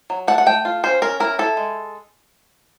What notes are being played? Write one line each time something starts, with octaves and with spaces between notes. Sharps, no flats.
F#3
A3 F#5
F#5
A3 G5
F4
C#4 C5
C#4 A#4
E4 A#4
E4 A4
G#3